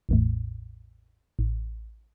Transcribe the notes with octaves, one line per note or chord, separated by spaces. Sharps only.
A1 E2 A2
A1